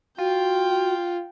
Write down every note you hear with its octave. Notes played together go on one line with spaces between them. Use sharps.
F4 F#4 G5